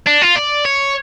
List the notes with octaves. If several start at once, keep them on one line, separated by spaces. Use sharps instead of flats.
D4
F4
D5
C#5